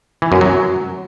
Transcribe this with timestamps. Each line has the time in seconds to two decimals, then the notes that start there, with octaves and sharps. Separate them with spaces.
0.22 E3
0.32 F#2
0.41 F#3